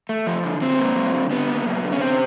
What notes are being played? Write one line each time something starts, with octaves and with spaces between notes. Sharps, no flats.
A3
F3
D3
D3 C4
A#3
F#3
D3
D3 B3
A#3
F#3
D3
C#4
C3 C4